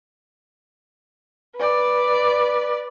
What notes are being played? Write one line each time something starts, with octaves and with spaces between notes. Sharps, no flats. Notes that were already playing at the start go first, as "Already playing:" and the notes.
B4 D5